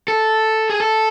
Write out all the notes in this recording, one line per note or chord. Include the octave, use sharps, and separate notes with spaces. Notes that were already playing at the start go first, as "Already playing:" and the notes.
A4
G#4
A4